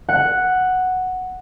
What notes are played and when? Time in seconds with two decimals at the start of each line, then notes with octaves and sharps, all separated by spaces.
0.09 F#5